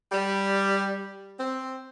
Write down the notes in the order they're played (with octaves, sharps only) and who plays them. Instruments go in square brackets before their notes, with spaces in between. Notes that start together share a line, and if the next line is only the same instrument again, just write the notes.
[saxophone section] G3
C4